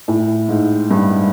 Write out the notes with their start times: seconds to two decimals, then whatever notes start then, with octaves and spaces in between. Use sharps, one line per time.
0.08 A2
0.49 G#2
0.91 G2